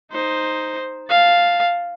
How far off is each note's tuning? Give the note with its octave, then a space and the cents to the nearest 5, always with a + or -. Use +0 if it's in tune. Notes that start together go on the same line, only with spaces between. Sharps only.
D#4 +0 C5 +0
F5 +0 A5 +0